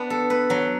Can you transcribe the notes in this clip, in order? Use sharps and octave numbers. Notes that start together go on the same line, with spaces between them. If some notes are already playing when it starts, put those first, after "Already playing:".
Already playing: B3 D4
A4
B4
F#3